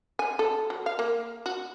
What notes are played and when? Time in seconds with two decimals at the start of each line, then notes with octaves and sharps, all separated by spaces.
0.19 G#5
0.39 A4
0.70 F#3
0.86 F5
0.99 A#3
1.46 F#4